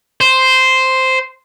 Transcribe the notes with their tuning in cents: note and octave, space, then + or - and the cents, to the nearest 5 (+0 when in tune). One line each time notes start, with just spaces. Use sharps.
C5 -5